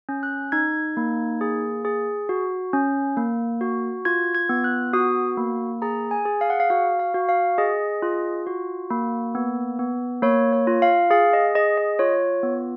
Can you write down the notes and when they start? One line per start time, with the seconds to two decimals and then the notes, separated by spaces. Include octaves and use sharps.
0.09 C#4
0.23 F#6
0.52 D#4 G#6
0.97 A#3
1.41 G#4
1.85 G#4
2.29 F#4
2.73 C#4
3.17 A#3
3.61 F#4
4.05 F4 G#6
4.35 G#6
4.49 B3
4.64 F#6
4.93 F#4 D#6
5.37 A#3
5.82 G#4 A#5
6.11 G#5
6.25 G#4
6.41 F5
6.50 F#5
6.60 F5
6.70 F#4 F5
6.99 F5
7.14 F#4
7.29 F5
7.58 G#4 D#5
8.02 F4
8.47 F#4
8.90 A#3
9.35 B3
9.79 B3
10.22 A#3 C#5
10.53 C#5
10.67 F4
10.82 F5
11.10 G#4 F5
11.33 D#5
11.55 G#4 D#5
11.78 D#5
11.99 F4 C#5
12.43 B3